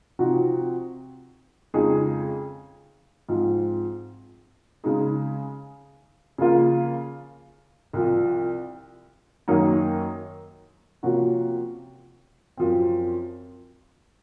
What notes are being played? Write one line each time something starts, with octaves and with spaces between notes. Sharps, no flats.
C3 F3 C4 D#4 F#4
F2 C#3 G#3 D#4 G#4
G#2 F3 C4
C#3 G#3 D#4 G#4
C#3 F3 A#3 F4
C2 C3 F3
F#2 D#3 F#3 A#3 D#4
C3 F3 A#3 C#4 F#4
F#2 F3 C4